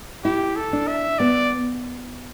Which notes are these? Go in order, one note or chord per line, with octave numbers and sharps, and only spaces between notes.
E4 G4
A4
D4
E5
B3 D5